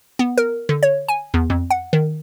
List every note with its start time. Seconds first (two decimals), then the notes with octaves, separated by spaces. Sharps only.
0.19 B3
0.38 A#4
0.69 D3
0.83 C#5
1.08 G#5
1.34 E2
1.50 F2
1.70 F#5
1.93 D#3